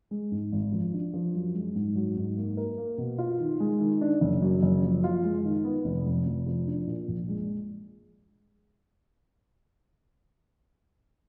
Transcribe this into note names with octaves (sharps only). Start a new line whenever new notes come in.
G#3
G#2
G#1
F3
D4
F3
F#2
G#3
G#2
F#3
G#2
A#3
A#4
A#3
B2
F4
D#3
G#3
D#3
D4
F#1
F#2
F#1
F3
F4
G#3
D#3
B3
F1
F2
F1
F3
D4
A#2
A#1
G#3